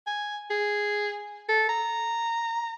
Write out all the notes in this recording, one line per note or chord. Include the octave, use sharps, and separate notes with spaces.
G#5
G#4
A4
A#5